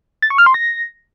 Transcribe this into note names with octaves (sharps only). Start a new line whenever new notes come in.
A6
C#6
F6
C6
A#6